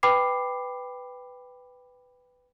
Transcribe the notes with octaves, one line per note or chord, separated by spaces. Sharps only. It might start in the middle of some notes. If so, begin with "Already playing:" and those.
B4 G5 B5 D6 C7